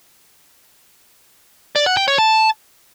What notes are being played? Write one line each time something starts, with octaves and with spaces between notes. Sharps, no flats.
D5
F#5
G5
C#5
A5